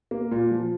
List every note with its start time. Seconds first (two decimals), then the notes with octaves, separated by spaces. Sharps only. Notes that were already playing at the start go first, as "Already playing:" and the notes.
0.11 A#3
0.31 A#2
0.51 F3